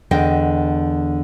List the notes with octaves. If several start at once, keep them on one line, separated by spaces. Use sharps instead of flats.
E2 D3 D#5 G5